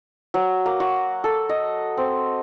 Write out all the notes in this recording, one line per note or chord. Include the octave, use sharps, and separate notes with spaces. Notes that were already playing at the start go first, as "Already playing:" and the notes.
F#3
A#3
F#4
A4
D#5
C4